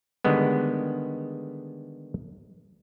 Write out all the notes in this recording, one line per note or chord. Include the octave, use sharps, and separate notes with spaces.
D3 D#3 G3 G#3 B3